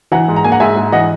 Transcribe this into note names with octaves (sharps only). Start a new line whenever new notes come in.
E3 F#5 A#5
G#2
A#5
A#3 G#5
F#5 A#5
G#2 E5 G#5
G#2
E3 D#5 F#5